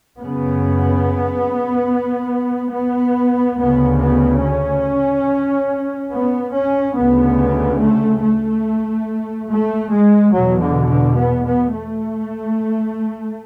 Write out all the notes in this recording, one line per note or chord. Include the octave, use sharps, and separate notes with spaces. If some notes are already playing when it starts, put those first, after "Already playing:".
F#2 C#3 B3
B3
D2 C#3 B3
B3
C#4
B3
C#4
D2 C#3 B3
A3
A3
A3
G#3
E2 B2 F#3
D3
D3
B3
B3
A3